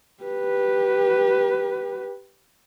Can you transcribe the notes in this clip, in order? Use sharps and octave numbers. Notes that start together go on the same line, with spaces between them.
G4 B4